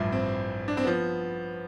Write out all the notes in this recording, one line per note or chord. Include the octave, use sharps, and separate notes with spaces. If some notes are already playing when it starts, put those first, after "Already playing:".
Already playing: A1 G2 F3 E4
C4
D4
C4
F3 B3